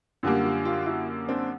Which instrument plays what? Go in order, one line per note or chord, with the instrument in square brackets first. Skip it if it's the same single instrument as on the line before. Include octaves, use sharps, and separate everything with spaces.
[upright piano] F#2 D3 G3 A#3 [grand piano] F4 G4
[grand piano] F4 G4
F4 G4
E4 F#4
C4 D4